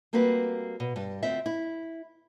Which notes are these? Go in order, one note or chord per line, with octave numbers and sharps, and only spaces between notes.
G3 A#3 C4 F#4 B4
B2
G2
D2 C4 F4 E5
E4